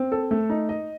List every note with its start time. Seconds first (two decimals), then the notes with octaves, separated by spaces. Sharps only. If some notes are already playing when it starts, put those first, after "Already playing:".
Already playing: C4
0.12 A4
0.31 A3
0.50 D#4
0.69 D#5